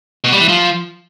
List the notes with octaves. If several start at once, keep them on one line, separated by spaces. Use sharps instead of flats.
B2
G3
E3
F3